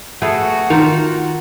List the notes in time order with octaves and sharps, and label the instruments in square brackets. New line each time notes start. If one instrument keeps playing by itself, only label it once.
[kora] A3 B3 G#4 [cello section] F#4
[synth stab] D#3 [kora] F4 A#4